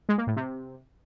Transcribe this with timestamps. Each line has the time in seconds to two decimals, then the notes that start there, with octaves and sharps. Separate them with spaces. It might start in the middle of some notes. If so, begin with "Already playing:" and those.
0.09 G#3
0.18 A#3
0.27 A2
0.36 C3